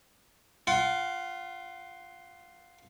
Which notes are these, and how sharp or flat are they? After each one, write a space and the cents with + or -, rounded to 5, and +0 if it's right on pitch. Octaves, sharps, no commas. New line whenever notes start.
F4 +0 F#5 +25